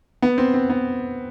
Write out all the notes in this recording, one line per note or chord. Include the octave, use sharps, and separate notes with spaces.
B3
C4
C4
B3